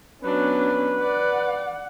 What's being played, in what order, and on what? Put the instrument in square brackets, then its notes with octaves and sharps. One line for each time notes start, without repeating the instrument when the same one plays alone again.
[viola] F#3 D4 [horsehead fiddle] B3 C#4 [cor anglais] B4
[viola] D5 [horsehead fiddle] F#5